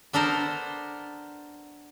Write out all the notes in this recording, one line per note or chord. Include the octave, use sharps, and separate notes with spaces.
B3 D4 A4 A#4 C5